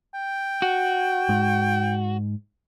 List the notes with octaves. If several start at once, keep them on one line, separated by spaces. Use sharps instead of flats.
G5
F#4
G#2 G#3